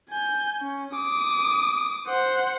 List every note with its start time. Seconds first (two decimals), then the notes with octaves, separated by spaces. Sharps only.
0.10 G#5 G6
0.62 C#4
0.96 D6 D#6
2.08 C5 F#5